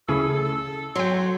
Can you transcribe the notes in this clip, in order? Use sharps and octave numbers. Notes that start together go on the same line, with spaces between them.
D2 C#3 C#4 E4 G#4 A4
F#3 G5 C6